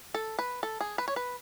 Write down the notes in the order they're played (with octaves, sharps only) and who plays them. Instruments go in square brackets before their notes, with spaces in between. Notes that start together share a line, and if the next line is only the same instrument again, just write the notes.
[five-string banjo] A4
B4
A4
G#4
B4
C#5
B4